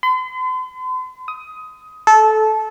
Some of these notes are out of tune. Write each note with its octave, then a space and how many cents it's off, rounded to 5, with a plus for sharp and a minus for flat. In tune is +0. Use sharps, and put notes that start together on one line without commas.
C6 -45
D#6 +15
A4 -20